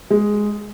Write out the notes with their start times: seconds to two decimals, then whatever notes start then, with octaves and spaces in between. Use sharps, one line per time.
0.10 G#3